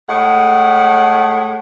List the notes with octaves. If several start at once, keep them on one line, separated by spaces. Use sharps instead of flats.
A2 G#3 F#5